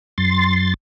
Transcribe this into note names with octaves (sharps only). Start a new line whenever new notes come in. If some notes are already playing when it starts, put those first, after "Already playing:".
F#2 C6 A6